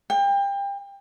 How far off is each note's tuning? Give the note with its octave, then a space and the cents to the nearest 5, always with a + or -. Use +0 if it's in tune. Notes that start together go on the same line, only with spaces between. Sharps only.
G5 +30